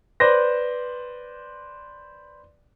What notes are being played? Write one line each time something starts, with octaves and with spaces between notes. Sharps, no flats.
B4 C5 D5 A#6